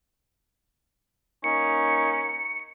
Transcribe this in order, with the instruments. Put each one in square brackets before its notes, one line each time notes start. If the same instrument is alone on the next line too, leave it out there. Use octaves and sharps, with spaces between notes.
[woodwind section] A#3 C#4 D#4 [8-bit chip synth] C#7